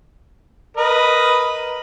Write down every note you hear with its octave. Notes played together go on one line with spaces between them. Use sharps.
A#4 B4 D#5